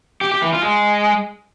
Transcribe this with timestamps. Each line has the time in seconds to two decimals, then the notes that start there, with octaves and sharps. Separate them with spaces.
0.21 G4
0.32 G4
0.42 E3
0.53 F4
0.63 G#3